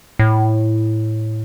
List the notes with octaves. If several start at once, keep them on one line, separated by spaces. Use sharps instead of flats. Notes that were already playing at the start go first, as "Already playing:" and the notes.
A2